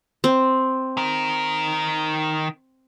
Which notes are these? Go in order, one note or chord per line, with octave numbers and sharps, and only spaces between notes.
C4
D#3 A#4